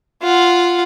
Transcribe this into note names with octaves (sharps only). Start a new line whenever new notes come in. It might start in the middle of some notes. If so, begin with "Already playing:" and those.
F4 F#5